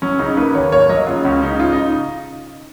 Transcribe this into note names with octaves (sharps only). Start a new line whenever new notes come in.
F#3 C#4
C#3 D#4
A#3 B4
D#2 C#5
A#3 C#5
F#3 D#5
C#3 F4
C#2 C#4
C#3 D#4
C#3 F4
D#4